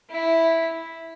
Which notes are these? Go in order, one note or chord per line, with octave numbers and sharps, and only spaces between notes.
E4